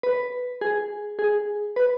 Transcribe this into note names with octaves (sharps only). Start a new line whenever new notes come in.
B4
G#4
G#4
B4